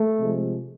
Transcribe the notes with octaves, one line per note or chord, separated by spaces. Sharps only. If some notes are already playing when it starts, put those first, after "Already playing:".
Already playing: A3
C3 F3 G#3